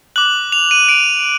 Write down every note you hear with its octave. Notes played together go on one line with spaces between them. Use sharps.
D6 F#6 F#7
F7
D#7
D7